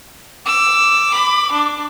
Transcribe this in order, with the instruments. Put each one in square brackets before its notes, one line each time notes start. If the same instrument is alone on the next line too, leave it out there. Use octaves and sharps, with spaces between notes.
[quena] D6 [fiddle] E6
[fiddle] B5
D4